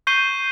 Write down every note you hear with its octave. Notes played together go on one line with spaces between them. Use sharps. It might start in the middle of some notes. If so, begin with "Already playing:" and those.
C#6 G6 C7 D#7 G7